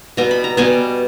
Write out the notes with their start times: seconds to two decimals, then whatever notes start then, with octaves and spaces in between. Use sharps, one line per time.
0.17 B2 G3 B3 A#5
0.31 B5
0.44 A#5
0.57 B2 G3 B3 G#5